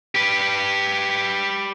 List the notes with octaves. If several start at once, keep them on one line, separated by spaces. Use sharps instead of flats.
G4 B4